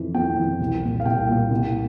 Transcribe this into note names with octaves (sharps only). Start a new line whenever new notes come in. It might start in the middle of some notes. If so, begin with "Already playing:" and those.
Already playing: F2 E3
F2 G5
E3
C2
A#2
F5
C2 G5
A#2
C2